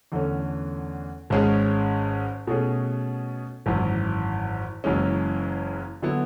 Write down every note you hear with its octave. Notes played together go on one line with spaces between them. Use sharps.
E2 D3 A3 C#4
G#1 G#2 G#3 C#4 G#4
B2 A3 C#4 G#4
G#1 F#2 E3
F#1 F#2 E3 G#3 C#4
D3 F#3 B3 E4